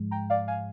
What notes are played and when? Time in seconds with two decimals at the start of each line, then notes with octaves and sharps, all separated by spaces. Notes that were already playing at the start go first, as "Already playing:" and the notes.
Already playing: G#2 F3 G#3
0.11 G5 A#5
0.30 D5 F5
0.48 F5 G#5